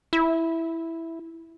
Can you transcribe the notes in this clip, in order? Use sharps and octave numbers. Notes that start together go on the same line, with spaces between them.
E4